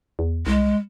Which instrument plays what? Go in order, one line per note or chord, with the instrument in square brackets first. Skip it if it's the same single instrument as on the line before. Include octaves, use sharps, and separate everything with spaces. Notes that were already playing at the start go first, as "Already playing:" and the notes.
[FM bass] E2
[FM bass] C2 [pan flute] G#3